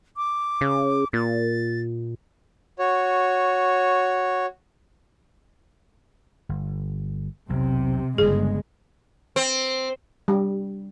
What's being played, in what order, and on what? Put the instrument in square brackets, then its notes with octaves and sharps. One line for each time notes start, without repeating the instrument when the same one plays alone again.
[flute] D6
[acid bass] C#3
[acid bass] A#2 [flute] A6
[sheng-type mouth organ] F#4 C#5
[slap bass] G1
[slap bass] B1 E2 [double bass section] C3
[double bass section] G1 G#3 [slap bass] G2 C#3 [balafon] G#4
[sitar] C4
[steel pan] G3